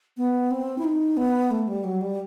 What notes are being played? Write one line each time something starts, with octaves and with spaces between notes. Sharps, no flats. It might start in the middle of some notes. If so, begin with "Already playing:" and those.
B3
C4
E4
D#4
B3
A3
G3
F#3
G3